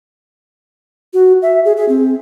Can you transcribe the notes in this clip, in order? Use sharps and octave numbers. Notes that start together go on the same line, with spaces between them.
F#4
E5
G#4
G#4
C4